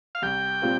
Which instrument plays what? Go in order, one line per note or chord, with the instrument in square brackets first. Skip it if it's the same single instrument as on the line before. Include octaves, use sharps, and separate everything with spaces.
[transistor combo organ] F5
[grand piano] C2 [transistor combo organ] G5
[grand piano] A#2 G3 C4 F4